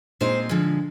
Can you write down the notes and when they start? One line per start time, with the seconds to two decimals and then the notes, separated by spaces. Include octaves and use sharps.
0.21 A#2 G#3 C4 D#4 C5
0.49 D3 F3 G#3